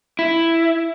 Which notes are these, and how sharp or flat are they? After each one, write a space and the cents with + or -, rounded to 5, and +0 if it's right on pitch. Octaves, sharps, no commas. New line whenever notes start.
E4 +5